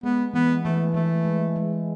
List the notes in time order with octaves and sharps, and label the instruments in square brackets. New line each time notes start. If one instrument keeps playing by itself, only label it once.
[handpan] G#3 [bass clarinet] B3
[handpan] E3 [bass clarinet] B3
[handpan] E3 [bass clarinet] A3
[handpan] E3 [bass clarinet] A3
[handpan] G#3
G#3